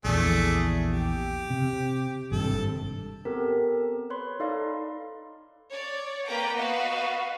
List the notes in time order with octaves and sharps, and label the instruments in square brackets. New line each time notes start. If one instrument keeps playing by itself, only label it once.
[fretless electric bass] A#1 E2 [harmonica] A3 D4 G#4
[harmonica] G4
[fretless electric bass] C3
[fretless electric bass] G#1 G2 C3 [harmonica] A4
[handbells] B3 C4 G4 A4 A#4
B4 C#5 B5 C6
D#4 A4 D5 D#5 F5 C6
[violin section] C#5 D5
A#3 B4 G5 A#5 D6
B3 F#4 B4 D#5 F5